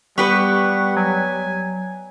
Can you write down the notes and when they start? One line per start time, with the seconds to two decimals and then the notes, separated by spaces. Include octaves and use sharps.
0.18 G3 B3 G4 B4 F#5 C#6
0.97 F#3 G#5